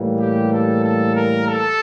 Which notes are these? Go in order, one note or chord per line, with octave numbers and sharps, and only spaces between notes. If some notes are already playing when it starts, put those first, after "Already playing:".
Already playing: A2 E3 G3 A#3
G4
A4
A4
A#4
A4